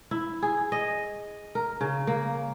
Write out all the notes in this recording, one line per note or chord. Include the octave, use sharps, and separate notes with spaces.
E4
G#4
D#5
A#4
C#3
A#3